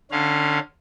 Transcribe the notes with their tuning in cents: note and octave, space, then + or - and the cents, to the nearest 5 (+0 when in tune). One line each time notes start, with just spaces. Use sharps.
D3 +20 C#4 +0 F5 +15